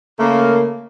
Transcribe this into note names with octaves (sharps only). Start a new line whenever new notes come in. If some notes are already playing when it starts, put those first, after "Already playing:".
C#3 A3 A#3